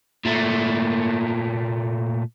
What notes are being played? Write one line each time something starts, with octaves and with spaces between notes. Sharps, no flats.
A#2 A3